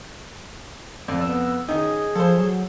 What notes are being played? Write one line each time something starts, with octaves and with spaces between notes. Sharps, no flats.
F2 D5
B3 E6
D#3 C#4 G#4 D#5
F3 A4 C5
F#3